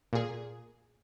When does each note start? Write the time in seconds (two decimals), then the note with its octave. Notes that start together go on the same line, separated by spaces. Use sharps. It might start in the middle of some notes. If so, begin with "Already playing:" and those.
0.13 A#2 G#4